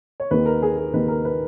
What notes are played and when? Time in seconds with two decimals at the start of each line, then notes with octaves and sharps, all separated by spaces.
0.20 C#5
0.31 D#2 D#3 A#3 B4
0.46 A#4
0.62 G#4
0.77 G#4
0.93 D#2 D#3 A#3 B4
1.08 A#4
1.25 B4